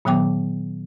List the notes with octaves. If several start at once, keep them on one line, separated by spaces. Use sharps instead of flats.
A#2 D#3 F#3 B3 G5 D6